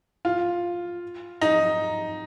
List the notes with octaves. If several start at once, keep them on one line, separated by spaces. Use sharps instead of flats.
F4
D#4